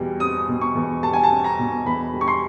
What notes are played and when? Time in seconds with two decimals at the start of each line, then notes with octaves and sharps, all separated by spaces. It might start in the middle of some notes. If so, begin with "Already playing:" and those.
Already playing: E2 B2 G3
0.20 C4 D#6
0.48 B2
0.61 C#6
0.75 E2
1.03 G3 A5
1.13 G#5
1.23 A5
1.31 C4
1.44 A#5
1.59 B2
1.86 E2 B5
2.13 G3
2.21 C#6
2.28 C6